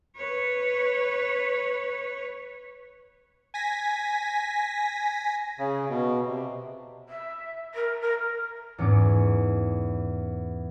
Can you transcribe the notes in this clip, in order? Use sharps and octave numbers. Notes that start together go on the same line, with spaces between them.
B4 C#5
G#5 A#6 B6
C#3
B2
C3
E5
A#4
A#4
E2 G#2 C#4 D6